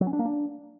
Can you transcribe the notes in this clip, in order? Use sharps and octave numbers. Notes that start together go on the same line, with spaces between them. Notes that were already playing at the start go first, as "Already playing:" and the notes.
F#3
C#4
D4
A#3
D4